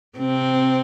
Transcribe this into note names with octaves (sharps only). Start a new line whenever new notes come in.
C3 C4